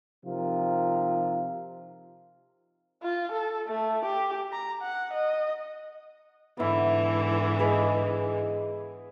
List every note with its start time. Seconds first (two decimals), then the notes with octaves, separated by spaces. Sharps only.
0.25 C3 F3 D#4 F4 A#4
3.03 F4
3.32 A4
3.68 A3
4.05 G4
4.52 A#5
4.82 F#5
5.13 D#5
6.57 G#2 D3 E3 B3 E4
7.59 G#4 B4 D#5